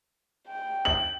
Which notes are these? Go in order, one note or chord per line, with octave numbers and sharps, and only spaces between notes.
G5
F#7